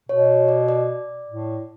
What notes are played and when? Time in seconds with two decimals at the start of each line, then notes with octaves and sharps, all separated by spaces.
0.09 B2 C#5
0.48 D5
0.69 D5
1.28 A2